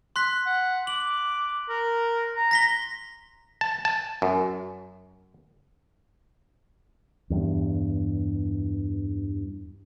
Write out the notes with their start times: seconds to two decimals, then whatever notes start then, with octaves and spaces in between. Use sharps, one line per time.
0.16 C6 F#6 B6
0.46 F#5
0.87 D6 F#7
1.69 A#4
2.36 A#5
2.51 A#6 B6 G7
3.61 A5
3.85 A5
4.22 F#2
7.30 E2 G2